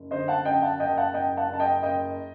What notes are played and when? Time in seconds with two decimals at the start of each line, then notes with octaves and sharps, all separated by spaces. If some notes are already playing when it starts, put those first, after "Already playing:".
Already playing: F#1
0.11 D3 C5 D#5
0.28 F#5 A5
0.45 F#2 D#5 G5
0.62 F#5 A5
0.80 F#1 D#5 G5
0.97 F#5 A5
1.14 F#1 D#5 G5
1.37 F#5 A5
1.49 F#1 A5
1.60 D#5 G5
1.83 F#1 D#5 G5